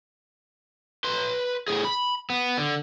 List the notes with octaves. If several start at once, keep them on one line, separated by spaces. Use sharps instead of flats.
B4 C6
A2 G#4
B5
B3
D3